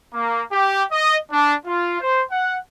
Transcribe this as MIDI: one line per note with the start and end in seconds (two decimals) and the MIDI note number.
0.13 0.42 58
0.52 0.83 67
0.92 1.17 75
1.31 1.54 62
1.66 1.99 65
2.01 2.23 72
2.31 2.57 78